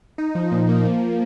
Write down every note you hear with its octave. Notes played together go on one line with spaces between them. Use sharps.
D#4
F3
A#2
A#3
F3